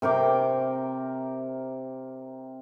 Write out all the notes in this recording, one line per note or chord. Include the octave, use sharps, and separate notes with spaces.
C3 A#4 G5 D6